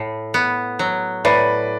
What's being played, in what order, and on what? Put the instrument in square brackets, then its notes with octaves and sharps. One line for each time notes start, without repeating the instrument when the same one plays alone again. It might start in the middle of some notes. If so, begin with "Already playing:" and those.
Already playing: [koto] A2
B3
F#3
[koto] A2 [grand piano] B4 D5